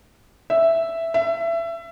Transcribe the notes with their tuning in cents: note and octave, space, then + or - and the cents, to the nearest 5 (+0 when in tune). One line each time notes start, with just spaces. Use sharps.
E5 +0
E5 +25